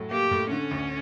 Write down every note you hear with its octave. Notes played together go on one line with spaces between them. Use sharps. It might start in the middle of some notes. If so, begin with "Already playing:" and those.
Already playing: A2 F#3
A#3 G4
A2
D3 C#4
D2